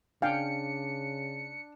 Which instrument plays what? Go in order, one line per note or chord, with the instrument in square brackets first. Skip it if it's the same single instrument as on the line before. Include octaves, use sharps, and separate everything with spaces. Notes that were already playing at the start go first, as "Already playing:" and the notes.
[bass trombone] C#3 [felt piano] D4 [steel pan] F5 G5 G#5 [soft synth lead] C#7